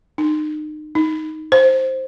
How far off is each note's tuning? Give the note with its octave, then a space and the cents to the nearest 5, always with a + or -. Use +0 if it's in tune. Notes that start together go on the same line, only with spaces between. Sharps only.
D#4 -30
D#4 +5
C5 +5